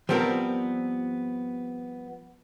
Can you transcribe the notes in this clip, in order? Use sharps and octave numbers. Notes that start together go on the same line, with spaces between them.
F3 G3 B3 C4 A#4